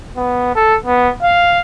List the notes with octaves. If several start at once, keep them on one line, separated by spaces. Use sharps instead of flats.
B3
A4
B3
F5